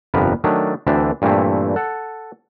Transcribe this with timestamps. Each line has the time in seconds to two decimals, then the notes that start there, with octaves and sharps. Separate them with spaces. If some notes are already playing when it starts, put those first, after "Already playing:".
0.14 G1 F2 C3 B3 A#4 B4
0.44 D#3 F#3 A3 D4
0.87 D2 E3 C4 D4 E5
1.22 G2 A#2 E3 A3 C4 E4
1.76 A4 F#5